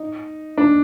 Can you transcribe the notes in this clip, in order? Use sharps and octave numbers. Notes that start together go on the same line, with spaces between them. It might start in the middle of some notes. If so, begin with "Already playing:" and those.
Already playing: D#4
D4